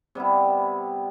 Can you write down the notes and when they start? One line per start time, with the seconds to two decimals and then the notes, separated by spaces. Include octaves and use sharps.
0.15 C3 G3 B3 E4